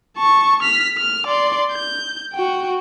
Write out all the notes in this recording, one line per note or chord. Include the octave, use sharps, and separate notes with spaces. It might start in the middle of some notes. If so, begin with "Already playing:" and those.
A5 C#6
F6 B6
F6
D5 C6
G6
F#4 G5